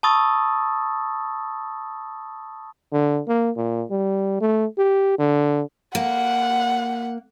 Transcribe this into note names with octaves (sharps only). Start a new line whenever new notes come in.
A5 B5 C#6 D#6 E6 A6
D3
A#3
A#2
G3
A3
G4
D3
A#3 F#5